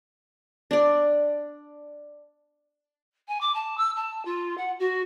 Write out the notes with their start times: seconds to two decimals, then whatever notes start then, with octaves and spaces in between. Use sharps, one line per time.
0.71 D4 D5
3.28 G#5
3.40 D6
3.54 A5
3.77 E6
3.96 A5
4.25 F4
4.57 F#5
4.79 F#4